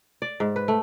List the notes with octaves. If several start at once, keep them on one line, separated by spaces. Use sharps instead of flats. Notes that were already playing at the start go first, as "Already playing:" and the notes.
D5
G#2
B4
A3